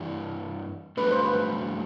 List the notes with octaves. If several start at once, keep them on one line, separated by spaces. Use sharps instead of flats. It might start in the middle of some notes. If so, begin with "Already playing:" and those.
Already playing: G2 E3 G3 D4
G2 F#3 A3 D4 A4 B4
C5
B4